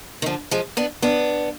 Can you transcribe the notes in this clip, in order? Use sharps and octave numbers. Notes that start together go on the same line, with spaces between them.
D#3
D3 F3
F3 G#3
B3 D4
B3 D4